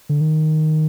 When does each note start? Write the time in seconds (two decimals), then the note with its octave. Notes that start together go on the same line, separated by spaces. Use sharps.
0.09 D3
0.21 D#3